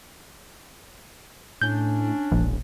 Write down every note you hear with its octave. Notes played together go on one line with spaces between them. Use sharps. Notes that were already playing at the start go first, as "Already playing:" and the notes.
A2 C#4 D4 G6
E1 A#1